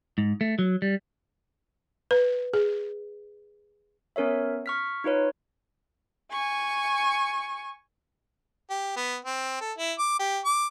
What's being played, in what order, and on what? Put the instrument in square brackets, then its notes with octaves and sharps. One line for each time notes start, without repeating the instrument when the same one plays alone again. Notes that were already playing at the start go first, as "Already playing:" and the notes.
[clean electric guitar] G#2
A3
F#3
G3
[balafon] B4
G#4
[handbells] B3 C#4 A#4 C#5 E5
C#6 F6 B6
D#4 F4 B4 C#5
[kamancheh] G#5 C#6
[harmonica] G4
B3
C4
A4
E4
D6
G4
D6